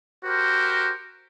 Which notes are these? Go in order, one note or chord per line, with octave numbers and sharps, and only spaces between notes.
F#4 G4 A#4 C5